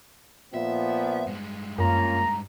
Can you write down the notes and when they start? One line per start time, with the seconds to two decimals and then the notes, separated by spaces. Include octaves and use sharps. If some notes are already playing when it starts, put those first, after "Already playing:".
0.54 A#2 F3 B3 E5
1.27 G2 G#3
1.78 F#2 A#3 C#4 F4 A#5